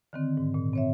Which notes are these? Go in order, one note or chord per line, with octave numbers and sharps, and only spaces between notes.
D3 D#3 C4
G#2
A#2
C4 C#5 E5